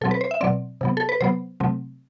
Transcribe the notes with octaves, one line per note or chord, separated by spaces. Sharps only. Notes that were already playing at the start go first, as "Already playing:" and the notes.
B2 F#3 C4 A4
B4
C5
E5
B2 F#3 C4 D5
C3 F#3 B3
A4
B4
C3 F#3 B3 C5
C3 F#3 A3 C4